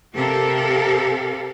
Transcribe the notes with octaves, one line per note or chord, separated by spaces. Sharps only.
C3 C4 G4 A4 A#4 F5